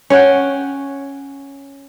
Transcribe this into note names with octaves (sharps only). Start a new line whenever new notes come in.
C#4 C#5 F#5 G5